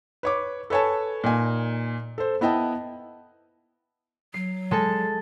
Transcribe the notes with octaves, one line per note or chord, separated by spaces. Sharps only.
B4 C#5 D6
A4 B4 C#5 G#5 A5
A#2 D#4 G#5
A4 C5
B3 E4 D#5 G5 A5
F#3 C7
G#3 A4 A5